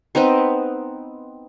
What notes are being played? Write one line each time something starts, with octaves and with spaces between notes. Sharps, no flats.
B3 C4 D#4 B4